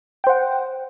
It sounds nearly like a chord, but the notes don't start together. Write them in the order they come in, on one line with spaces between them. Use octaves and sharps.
G5 C5 F#5